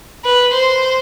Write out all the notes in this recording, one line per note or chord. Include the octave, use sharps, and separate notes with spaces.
B4
C5